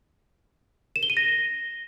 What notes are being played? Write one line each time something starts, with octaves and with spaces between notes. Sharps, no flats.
E7
G7
D#7
A#6